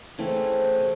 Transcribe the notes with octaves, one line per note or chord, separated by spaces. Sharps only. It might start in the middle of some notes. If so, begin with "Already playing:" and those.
C#3 E3 A3 C4
C3